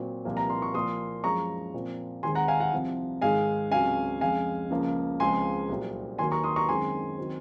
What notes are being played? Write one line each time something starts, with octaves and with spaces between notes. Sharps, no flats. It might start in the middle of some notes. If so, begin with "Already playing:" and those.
Already playing: A#2 F#3 C4
C2 A#2 F3 A#3
A#5
C6
C#6
A#2 F3 A#3 C6 D#6
F#2 F3 G#3 A#5 C#6
A#2 F3 C4
D#2 D#3 G#3 C4 G#5 C6
F#5 A#5
F5 G#5
F#5
C2 C3 F3
G#2 D#3 G#3 F5 G#5
C#2 C3 F#3 F5 G#5
F2 C#3 G#3 F5 G#5
C#2 C#3 F3 A#3
C#2 C#3 F3 G#3 C4 G#5 C6
C2 A#2 F#3 C4
D#2 D#3 F#3 A#3 G#5 C6
A#5 C#6
C6 D#6
A#5 C#6
F#2 D#3 G#3 C4 G#5 C6
D#3 F#3 C4